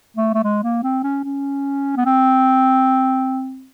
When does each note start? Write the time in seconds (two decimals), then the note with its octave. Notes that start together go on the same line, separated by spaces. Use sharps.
0.17 A3
0.34 A3
0.44 G#3
0.63 A#3
0.83 C4
1.03 C#4
1.24 C#4
1.97 B3
2.06 C4